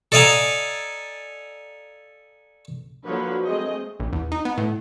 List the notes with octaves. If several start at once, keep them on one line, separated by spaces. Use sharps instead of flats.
A4 D5 D#5 F5 G#5 A#5
D3 F3 F#3 A#3 B4 C#5
G#3 A3 C4 G#4 D#5
A#1
E2
D#4
B3
A2